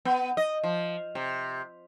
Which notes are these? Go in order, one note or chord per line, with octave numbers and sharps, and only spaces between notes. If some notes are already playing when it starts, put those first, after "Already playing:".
B3
D#5
F3
C3